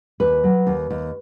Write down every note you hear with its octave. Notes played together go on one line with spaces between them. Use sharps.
D#2 B4
F#3
D#2
D#2